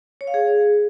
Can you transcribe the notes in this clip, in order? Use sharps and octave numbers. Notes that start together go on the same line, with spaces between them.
C#5
F5
G#4